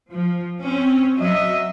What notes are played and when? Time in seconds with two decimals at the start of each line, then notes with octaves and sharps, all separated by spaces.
0.11 F3
0.65 C4 C#4
1.18 F#3 D#5 E5